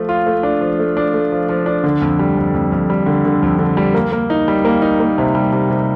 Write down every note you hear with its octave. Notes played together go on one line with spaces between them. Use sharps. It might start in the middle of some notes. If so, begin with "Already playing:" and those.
Already playing: F3 A3
F4
A3
D4
F3
A3
D4
A3
F3
F3
D4
D3
F2
G3
F2
F2
F2
G3
D3
D3
F2
D3
G3
A#3
A#3
D#4
G3
A#3
D#4
A#3
C3
G3
C3
C3